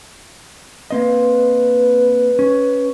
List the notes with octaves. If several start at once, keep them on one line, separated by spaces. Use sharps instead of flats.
A#3 C4 B4 D#5
C#4